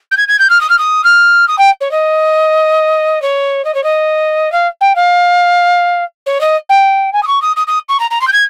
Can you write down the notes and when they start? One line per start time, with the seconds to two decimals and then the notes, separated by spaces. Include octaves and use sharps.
0.11 G6
0.17 G#6
0.28 G#6
0.39 G6
0.50 F6
0.61 D#6
0.70 F6
0.78 D#6
1.04 F6
1.48 D#6
1.58 G5
1.81 C#5
1.91 D#5
3.22 C#5
3.65 D#5
3.75 C#5
3.84 D#5
4.52 F5
4.81 G5
4.96 F5
6.26 C#5
6.41 D#5
6.69 G5
7.13 G#5
7.23 D#6
7.27 C#6
7.42 D#6
7.56 D#6
7.67 D#6
7.89 C#6
8.00 A#5
8.11 A#5
8.21 C6
8.27 G6
8.33 G#6